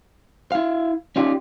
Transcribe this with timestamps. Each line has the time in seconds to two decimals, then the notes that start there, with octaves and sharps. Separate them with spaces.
0.52 E4 F5
1.16 C#4 D#4 F4 G4 D5